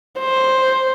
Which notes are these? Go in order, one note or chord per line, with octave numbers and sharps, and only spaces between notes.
C5